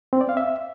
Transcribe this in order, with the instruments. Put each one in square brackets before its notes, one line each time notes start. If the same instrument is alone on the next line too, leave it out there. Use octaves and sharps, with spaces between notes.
[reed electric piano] C4
D5
F5
E5